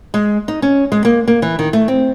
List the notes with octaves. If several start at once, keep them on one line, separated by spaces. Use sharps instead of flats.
G#3
D#4
C#4
G#3
A#3
A#3
E3
D#3
A3
C4